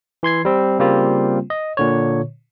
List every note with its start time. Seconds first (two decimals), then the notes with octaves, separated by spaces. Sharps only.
0.23 E3 C6 G#6 C7
0.45 G3 C4
0.79 C#3 G3 A#3 C4 F4
1.50 D#5
1.77 A#2 D3 C#5